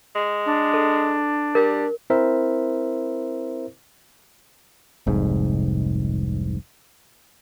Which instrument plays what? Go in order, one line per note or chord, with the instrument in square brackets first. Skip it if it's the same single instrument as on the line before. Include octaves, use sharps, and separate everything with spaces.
[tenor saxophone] G#3
[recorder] D4
[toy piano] A4
[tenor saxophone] G3 [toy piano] A#4
[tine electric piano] C4 E4 A#4 C5 E5
[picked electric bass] F1 C2 G#2